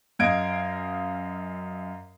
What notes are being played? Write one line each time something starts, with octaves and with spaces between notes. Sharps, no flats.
F#2 D#5 F5 G#6 D7